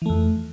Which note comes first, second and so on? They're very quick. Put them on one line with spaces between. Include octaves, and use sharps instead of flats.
E3 A3 F2